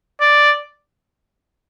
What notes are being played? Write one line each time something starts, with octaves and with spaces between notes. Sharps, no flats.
D5